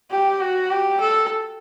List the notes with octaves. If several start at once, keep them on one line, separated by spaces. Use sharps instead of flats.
G4
F#4
G4
A4